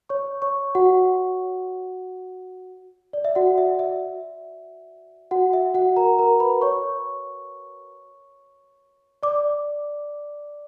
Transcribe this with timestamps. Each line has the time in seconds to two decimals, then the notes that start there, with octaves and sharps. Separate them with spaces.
0.09 C#5 C#6
0.42 C#5 C#6
0.75 F#4 F#5
3.13 D5
3.25 E5
3.35 F#4 F#5
3.58 E5
3.79 E5
5.31 F#4 F#5
5.53 E5
5.74 F#4 F#5
5.96 A#4 A#5
6.19 A#4 A#5
6.40 B4 B5
6.61 C#5 C#6
9.23 D5 D6